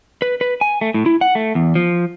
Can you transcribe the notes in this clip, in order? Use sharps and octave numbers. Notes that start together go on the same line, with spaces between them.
B4
B4
G#5
A3
A2
E4
F#5
A3
E2
F3